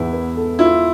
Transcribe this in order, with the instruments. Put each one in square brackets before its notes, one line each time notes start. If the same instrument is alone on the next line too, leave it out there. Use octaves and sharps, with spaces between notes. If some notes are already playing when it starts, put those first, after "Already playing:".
Already playing: [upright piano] E2 [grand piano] E4
[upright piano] B3
A4
[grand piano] E4 [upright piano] F4